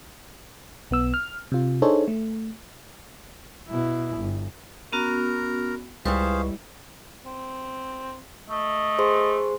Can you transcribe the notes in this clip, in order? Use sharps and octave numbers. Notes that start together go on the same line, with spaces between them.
B1 B3 E6
F6
C3 F4
D4 D#4 G#4 A4 C5 C#5
A3
B2 E4
G1
B3 C#4 F#4 A#4 A#5
C#2 G3 E4 G#4 B4 C5 F5 C#6
C4
A3 D#5
G#4 C5 C6